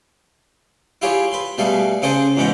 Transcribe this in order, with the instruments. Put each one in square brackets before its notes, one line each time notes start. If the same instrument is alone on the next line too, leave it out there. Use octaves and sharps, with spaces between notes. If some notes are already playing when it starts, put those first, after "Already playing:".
[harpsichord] E4 F4 G4 G#4 C#5
B4 C6
B2 G3 A3 G#4 F5
C#3 C4 G#4 A4 C5
E2 G#2 B2 B3 G5 A#5